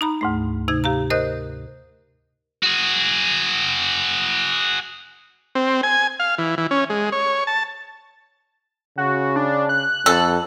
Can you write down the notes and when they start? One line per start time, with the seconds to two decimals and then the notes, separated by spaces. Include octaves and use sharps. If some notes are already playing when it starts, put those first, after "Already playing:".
0.01 D#4 A#5 B5
0.21 D2 G#2 A3
0.68 C3 D#4 G#6
0.84 G4 F5 A#5
1.10 A#4 C5 D#5 D#6 F#6 G6
2.63 F#4 G#4
5.55 C4
5.83 G#5
6.20 F5
6.38 E3
6.58 E3
6.71 C#4
6.90 G#3
7.12 C#5
7.47 A5
8.98 C#3 F#4
9.36 D4
9.69 F#6
10.06 F2 A4